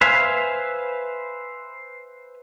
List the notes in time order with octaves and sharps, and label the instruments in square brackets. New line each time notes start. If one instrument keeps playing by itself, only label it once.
[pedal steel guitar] B4 C5 E5 F5 G#5